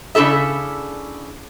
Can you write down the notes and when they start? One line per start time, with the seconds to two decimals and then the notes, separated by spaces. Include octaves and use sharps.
0.15 C#3 D4 E4 A4 E5